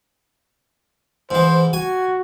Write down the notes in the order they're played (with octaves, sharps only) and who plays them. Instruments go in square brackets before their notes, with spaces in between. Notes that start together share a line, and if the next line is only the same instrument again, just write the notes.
[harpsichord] G#2 E3 [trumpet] C5
[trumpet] F#4 [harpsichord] G#5